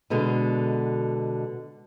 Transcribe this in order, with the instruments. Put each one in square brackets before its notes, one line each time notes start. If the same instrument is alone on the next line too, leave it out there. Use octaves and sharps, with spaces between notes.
[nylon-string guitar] B2 D3 G#3